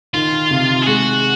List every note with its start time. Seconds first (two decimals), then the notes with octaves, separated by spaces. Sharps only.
0.14 D#3 F4
0.50 C3
0.82 G#4
0.87 G#3 F#4